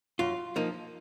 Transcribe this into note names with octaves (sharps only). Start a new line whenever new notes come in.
F#2 F4
F3 A#3 D#4